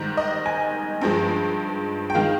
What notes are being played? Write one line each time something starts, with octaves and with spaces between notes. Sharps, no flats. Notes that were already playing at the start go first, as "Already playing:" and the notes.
Already playing: G#2 D#3 G3
D#5
G#5
G2 F3 G#3
G5
D#3 G#3 F5